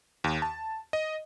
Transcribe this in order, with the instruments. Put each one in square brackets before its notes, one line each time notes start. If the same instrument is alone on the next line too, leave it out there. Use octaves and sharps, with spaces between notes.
[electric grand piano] D#2
A5
D#5